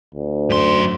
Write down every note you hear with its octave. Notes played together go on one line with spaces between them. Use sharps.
D2
F#2 C6